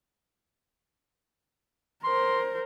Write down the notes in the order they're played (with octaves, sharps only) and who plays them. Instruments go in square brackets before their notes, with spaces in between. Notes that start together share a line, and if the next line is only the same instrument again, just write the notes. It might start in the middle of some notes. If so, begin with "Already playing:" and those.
[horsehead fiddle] A#4 C5 [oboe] C6